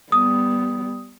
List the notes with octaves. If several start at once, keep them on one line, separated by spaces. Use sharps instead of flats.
G3 B3 D#6